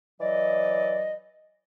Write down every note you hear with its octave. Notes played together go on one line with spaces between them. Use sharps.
E3 F#3 D5 D#5